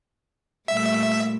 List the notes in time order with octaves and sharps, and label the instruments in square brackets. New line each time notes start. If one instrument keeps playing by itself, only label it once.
[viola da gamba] A#2 G3 A3 [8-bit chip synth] E5